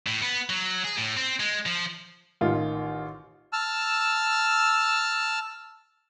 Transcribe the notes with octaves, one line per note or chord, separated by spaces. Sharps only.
A2
B3
F#3
G#4
A2
C4
G#3
F3
A1 D#3 F4
A5 E6 F6